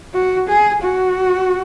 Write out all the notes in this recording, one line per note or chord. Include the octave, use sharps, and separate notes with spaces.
F#4
G#4
F#4